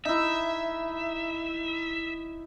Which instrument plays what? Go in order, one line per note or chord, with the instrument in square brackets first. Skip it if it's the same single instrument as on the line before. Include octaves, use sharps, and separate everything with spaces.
[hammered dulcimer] D#4 E4 [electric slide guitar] E5